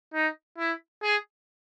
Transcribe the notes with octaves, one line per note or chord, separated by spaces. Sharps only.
D#4
E4
G#4